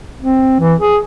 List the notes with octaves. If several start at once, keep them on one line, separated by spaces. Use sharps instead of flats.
C4
E3
G#4